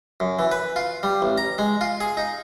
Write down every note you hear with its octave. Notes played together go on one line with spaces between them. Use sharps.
F#2
E3
B4
F4
G3
A1
A#5
G#3
F4
G#4
D#4